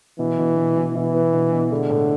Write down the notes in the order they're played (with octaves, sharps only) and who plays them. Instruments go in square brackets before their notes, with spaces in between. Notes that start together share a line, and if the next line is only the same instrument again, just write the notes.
[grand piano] B2 [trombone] E3
[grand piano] B2
B2
B2
[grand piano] B2 [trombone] E3
[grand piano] B3
B2
B2
[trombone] D3 [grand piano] G#3
[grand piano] A2